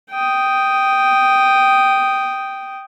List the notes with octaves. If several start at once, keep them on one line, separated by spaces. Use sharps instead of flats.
G5 D#6